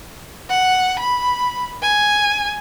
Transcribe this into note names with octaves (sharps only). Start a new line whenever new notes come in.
F#5
B5
G#5